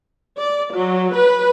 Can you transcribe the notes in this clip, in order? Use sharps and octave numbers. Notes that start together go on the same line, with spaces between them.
D5
F#3
B4